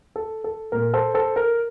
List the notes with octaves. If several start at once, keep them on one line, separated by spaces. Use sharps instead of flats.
A4
A4
A#2 A#4
A4 C5
A4 C5
A#4